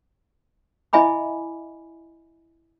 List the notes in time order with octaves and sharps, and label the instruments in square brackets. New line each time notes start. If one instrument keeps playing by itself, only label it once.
[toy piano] E4 D#5 E5 G#5 B5 D6